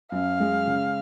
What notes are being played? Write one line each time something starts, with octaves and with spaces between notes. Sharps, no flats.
F#2 F5
G#3
C#3